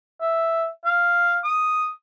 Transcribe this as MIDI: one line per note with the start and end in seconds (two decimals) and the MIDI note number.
0.21 0.67 76
0.85 1.39 77
1.44 1.89 87